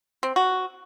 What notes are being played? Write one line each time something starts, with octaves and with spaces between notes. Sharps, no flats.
C4
F#4